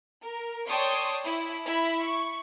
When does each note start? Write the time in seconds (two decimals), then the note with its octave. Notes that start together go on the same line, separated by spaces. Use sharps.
0.22 A#4
0.67 C#5 D5 G5 A5 C6 D#6
1.24 E4
1.64 E4 B5
2.01 C#6